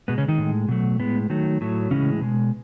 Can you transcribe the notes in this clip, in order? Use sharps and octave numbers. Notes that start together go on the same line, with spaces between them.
B2 G#3 B3
C#3 C#4
D#3 D#4
A2 G#3
B2 F#3 A3
A2 G#3 B3
D#3 F#3 A3
A2 F#3 A3
A2 C#3 E3 G#3 C#4
B2 G#3